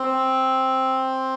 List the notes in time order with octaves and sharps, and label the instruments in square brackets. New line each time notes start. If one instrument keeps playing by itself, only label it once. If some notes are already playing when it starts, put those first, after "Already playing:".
Already playing: [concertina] C4